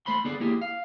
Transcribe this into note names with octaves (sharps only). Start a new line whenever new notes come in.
A3 C5 B5 C6
D3 B3 G#4 A4 D5
A#3 E4 G4 G#4
F5